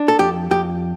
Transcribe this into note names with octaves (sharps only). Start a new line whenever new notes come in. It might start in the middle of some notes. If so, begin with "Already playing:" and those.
Already playing: D4
A4
F2 G4
F2 G4